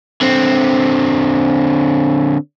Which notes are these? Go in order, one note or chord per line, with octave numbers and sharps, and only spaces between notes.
D3 C4